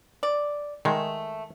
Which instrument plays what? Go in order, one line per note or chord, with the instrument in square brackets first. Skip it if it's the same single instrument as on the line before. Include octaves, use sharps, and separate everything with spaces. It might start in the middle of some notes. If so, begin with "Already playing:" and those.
[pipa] D5
[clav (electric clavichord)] D#3 G#3 [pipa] A3